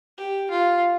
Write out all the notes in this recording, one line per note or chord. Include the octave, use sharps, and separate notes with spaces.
G4
F4